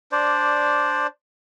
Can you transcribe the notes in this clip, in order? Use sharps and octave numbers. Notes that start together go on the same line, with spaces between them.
D4 C5 D5